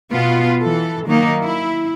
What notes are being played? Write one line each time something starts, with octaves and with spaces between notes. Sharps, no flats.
B2 B3 F4
E3 A4
D#3 F#3 A#3 D#4
E4